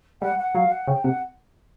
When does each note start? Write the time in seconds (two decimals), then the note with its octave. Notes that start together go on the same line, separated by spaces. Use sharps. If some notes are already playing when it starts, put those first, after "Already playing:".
0.21 G3 F#5
0.38 F#5
0.55 F#3 F5
0.71 F#5
0.87 C#3 G5
1.04 C3 F#5